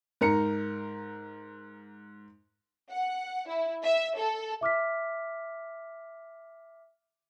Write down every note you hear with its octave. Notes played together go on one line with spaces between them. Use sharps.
G#2 A#4 A#5 C#7
F#5
E4
E5
A4
E5 D6 F6 B6